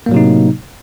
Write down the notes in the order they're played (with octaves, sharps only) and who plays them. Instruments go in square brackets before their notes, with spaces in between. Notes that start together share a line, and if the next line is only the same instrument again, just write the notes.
[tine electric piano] A#3
A2
F#3
C3
D#4